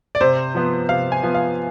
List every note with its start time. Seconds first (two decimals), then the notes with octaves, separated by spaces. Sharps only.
0.15 D5
0.21 C3 C5
0.55 F3 B3
0.89 C3 F5
1.12 G#5
1.23 F3 B3
1.34 F5